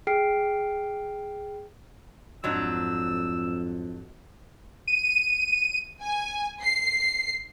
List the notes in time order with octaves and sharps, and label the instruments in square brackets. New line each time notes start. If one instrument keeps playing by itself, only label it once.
[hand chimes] G#4 G5 F6 C7 D7
[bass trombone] F2 [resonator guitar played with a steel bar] G#2 F#3 D4 [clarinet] E6
[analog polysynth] D#7
[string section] G#5
C7